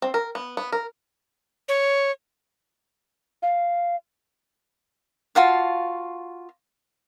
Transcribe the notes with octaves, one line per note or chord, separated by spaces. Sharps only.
C4
A#4
B3
B3
A#4
C#5
F5
F4 F#4 F5 A5